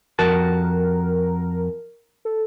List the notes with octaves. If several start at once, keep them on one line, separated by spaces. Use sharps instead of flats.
F2 F#4 A#4 A5
A4